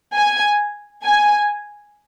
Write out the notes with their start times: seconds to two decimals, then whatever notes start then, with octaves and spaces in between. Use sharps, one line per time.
0.16 G#5
1.04 G#5